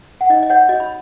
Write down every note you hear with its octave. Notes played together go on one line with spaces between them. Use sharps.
F#5
D#4 D#5
D#5
C#5 F#5
F#4 C#5 D#5
B5